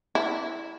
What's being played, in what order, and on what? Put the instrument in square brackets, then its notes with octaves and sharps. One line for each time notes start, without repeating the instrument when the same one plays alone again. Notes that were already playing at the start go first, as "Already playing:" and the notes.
[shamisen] E4